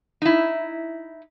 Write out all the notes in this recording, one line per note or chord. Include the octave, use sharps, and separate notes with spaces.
D#4 E4